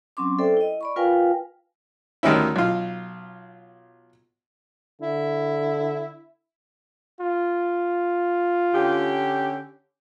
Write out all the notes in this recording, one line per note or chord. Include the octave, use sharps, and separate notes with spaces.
F#3 C4 C#4 C6 D6
A4 C5 D5 E5 G5
E4 D#5
D5 B5 C#6
F4 A#4 B4 F5 G5 G#5
D2 D#3 G3 C#4 E4
B1 F4
D3 E4
F4
D3 C#4 G4